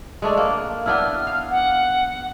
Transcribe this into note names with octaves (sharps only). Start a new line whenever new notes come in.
G#3 A3 D4
A#3
B3 D4 E4 F6
F5
F#5